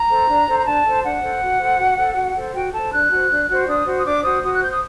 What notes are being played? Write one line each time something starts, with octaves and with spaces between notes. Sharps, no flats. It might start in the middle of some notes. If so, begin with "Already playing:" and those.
Already playing: A#5
A4 C5
D4
A4 C5
A#5
D4 A5
A4 C5
D4 F#5
A4 C5
F#4
A4 C5
F#4
A4 C5
F#4
A4 C5
F#4 G5
A4 C5 A5
D4 F#6
F#4
C5
D4
F#4 C5
D4 D#6
F#4 C5
D#6
D4 D6
F#4 C5 D#6
F#4 D#6
F#6
C5 G6
D#6